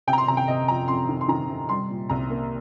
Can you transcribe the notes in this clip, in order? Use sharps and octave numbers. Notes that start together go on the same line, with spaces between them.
C3 G5
A#5
C6
C3 A#5
G5
C3 D#5
F2 A#5
F2 C6
D#3
C6
D#3 A#5
C3
G3 C6
A#2
C2 A#5
A#3